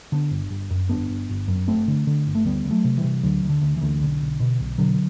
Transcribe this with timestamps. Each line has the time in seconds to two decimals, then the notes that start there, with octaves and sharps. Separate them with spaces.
0.12 D3 B3 D4
0.31 G1
0.51 G1
0.70 F#2
0.89 G1 B3 D4
1.09 G1
1.29 G1
1.48 F#2
1.67 G1 A3 C4
1.88 D3
2.07 D3
2.27 G1
2.35 A3
2.45 D2 G3 B3
2.65 D2
2.71 F#3 A3
2.84 C3
2.98 E3 G3
3.04 C3
3.23 D2 D3 F#3
3.43 D2
3.49 D3
3.62 D2
3.76 E3
3.81 D2
4.01 B1 D3
4.21 B1
4.40 B2
4.60 B1
4.78 B2 D3 F#3